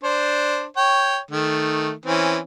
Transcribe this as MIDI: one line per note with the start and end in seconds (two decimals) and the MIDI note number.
0.04 0.64 62
0.04 0.64 72
0.77 1.18 73
0.77 1.18 79
1.31 1.91 51
1.31 1.91 57
2.06 2.38 52
2.06 2.38 60
2.06 2.38 61